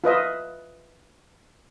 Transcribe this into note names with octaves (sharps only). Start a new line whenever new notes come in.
F4 B4 D#5 E5